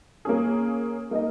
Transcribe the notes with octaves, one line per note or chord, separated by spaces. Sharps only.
A#3 C#4 G#4
A#3 D#4 A#4 D#5